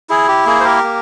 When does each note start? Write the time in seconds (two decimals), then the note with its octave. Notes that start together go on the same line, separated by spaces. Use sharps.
0.10 E4 G#4
0.28 G4
0.46 A#3 G#4
0.60 C5
0.64 G4 A#4
0.84 A#3